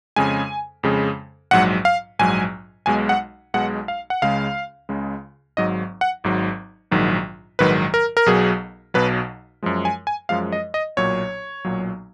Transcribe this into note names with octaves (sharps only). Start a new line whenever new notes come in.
F2 C#3 G#3 G#5
F2 C#3 G#3
A#1 G#2 F#3 F#5
F5
A#1 G#2 F#3 G#5
B1 B2 G#3 G#5
F#5
B1 B2 G#3 F#5
F5
F#5
C#2 C#3 G#3 F5
C#2 C#3 G#3
G#1 G#2 F#3 D#5
F#5
G#1 G#2 F#3
A#1 G#2 D#3 F#3
A#1 G#2 D#3 F#3 B4
A#4
A#4
B1 B2 F#3 G#4
B1 B2 F#3 B4
F#2 F3 G#3
G#5
G#5
F#2 F3 G#3 F5
D#5
D#5
B1 A#2 F#3 C#5
B1 A#2 F#3